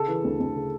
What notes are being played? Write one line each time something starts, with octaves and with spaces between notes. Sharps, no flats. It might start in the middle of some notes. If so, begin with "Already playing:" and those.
Already playing: C#3 A4
E3
D2
D2
C#3